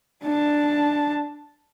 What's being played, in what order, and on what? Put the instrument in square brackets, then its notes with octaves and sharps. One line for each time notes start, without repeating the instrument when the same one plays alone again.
[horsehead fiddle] D4 A5